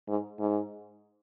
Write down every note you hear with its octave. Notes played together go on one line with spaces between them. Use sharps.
G#2
G#2